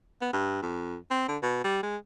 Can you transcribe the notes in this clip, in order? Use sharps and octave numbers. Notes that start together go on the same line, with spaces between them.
B3
G2
F2
C4
D3
B2
G3
G#3